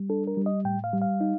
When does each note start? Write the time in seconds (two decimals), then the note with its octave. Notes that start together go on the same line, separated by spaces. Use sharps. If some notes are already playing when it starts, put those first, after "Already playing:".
Already playing: G3
0.10 D4 A4
0.27 A#4
0.37 G3
0.46 D#5
0.65 A2 G5
0.84 F5
0.93 G3
1.02 F5
1.21 D#4